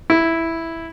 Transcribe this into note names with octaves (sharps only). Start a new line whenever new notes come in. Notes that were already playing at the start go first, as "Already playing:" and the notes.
E4